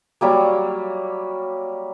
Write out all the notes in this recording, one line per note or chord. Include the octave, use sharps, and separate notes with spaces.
F#3 G3 A#3